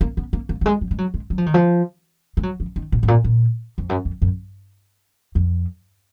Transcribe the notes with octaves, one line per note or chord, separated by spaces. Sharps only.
A#3
B3
A#3
A#3
F#3
G#3
F#3
G#3
F#3
G#3
F#3
F3
D#3
F3
G#3
F#3
F3
D#3
B2
G#2
A#2
A#2
F2
F#2
F2
F#2
F2